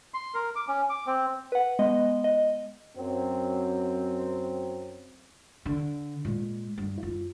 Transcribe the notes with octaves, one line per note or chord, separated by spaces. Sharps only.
C6
A#4
D6
C#4
D6
C4
B4 F#5
G#3 B3 D#5
D#5
F#2 F#3 C4
D3
A#2 G#3
G2
F#2 F4